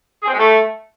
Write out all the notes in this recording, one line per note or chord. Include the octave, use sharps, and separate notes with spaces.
G#4
C4
G#3
A3